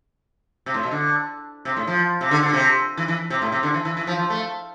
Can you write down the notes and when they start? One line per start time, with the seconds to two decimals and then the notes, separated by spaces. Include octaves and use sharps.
0.66 C3
0.74 A2
0.83 B2
0.91 D3
1.65 C3
1.77 A2
1.87 F3
2.21 C3
2.31 D3
2.43 D3
2.53 C3
2.97 E3
3.08 E3
3.30 C3
3.42 A2
3.52 C3
3.63 D3
3.74 E3
3.85 E3
3.97 E3
4.07 F3
4.18 F3
4.30 A3